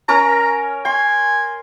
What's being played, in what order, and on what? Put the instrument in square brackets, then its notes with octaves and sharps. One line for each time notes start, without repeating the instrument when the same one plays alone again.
[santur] C#4 A#4 C#5 [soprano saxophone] A#5
[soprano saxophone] G#5 [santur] C6